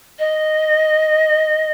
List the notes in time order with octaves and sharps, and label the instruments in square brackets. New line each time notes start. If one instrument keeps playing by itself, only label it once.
[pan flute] D#5